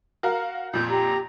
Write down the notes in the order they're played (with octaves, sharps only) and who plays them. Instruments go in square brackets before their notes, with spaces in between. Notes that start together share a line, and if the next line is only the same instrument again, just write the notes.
[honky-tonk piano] F#4 A#4 F5
[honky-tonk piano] F2 A#2 [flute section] G6
[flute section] G4 A#5